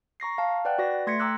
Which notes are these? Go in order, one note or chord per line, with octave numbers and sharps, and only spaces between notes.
A#5 C#6 A#6 C7
F5 A5
B4 D5 F#5 G5 F#6
F#4 B4 D5 A#6
A3 C6 G#6 A#6 B6 C#7
G5 A#5 D6 E6 F#6